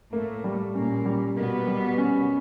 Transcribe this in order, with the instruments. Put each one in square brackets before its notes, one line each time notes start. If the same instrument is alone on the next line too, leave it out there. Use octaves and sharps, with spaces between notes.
[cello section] A2 A3 [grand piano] A#3
[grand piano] G3
[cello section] A#2 A#3 [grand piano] C#4
[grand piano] G3
[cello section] B2 B3 [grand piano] A#3
[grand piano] G3
C#4